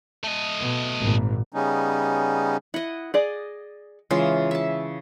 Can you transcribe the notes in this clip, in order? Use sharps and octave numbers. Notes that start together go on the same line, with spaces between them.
A3 D#5
B2
G#1 A#2
C#3 G3 B3 C#4 D#4
E4 D#5 F#5
G#4 D5 D#5
C#3 E3 G#3 F4
E5 A5